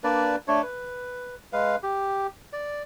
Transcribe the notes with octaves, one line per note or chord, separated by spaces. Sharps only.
A#3 D4 B4 D5
A3 D4 C#5
B4
G#3 B4 F5
G4
D5